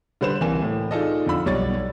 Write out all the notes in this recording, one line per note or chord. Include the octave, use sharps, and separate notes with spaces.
D3 G3 B4 C5 E7
C2 E3 A#3 G#5 E7
A2
D#4 F4 G#4 A4 D5 D#5
F2 D3 F4 B5 E6
B1 G3 C#5 D5 A6